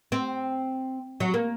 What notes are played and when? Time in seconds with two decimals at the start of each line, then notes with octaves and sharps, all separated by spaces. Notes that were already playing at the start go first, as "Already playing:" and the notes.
0.12 C4
1.20 F#3
1.34 A#3